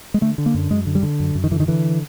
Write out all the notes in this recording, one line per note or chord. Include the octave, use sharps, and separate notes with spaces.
G#3
D3 A3
D3
A#3
F#2
F#2 G#3
D3
G3
D3
F#2
F#2
D#3
D3 E3
D#3
D3 E3